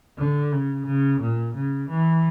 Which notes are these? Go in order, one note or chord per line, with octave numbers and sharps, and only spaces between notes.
D3
C#3
C#3
A#2
C#3
E3